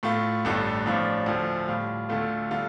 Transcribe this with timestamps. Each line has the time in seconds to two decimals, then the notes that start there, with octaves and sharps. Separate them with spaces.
0.03 A2 A3 F4
0.45 A1 G2 D3 A3
0.86 A1 A2 F3 D4 F4
1.26 D2 D3 F3
1.68 A2 G3 F4
2.09 D2 D3 A3 F4
2.51 D3 G3 F4